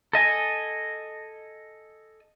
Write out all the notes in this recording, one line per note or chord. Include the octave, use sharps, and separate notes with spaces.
A4 D#5 G#5